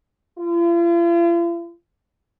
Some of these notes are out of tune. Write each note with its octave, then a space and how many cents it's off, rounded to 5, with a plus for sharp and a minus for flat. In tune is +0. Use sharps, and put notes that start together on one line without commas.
F4 -45